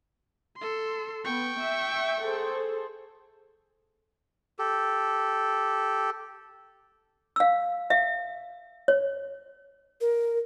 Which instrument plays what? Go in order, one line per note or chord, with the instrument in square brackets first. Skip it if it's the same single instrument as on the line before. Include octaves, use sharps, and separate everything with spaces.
[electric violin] A4 C6
[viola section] B3 [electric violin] G5 C#6
[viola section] E5
G#4 A4 C5
[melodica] G4 A4
[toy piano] F5 E6
E5 F5
C#5
[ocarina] A#4